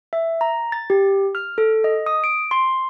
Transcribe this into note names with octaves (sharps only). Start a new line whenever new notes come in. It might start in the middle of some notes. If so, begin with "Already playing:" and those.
E5
A#5
A6
G4
F6
A4
D#5
D#6
D7
C6